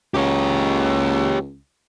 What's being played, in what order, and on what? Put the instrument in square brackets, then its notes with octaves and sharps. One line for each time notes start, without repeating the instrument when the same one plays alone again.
[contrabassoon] C#2 [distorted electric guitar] G4 C#5